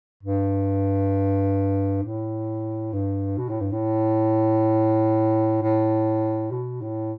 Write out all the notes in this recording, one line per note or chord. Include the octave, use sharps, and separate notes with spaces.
G2
A2
G2
B2
A2
G2
A2
A2
B2
A2